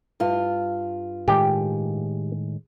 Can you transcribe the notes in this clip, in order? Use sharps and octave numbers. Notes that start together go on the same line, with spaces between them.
G2 F4
A2 D#3 G#3 G4 G5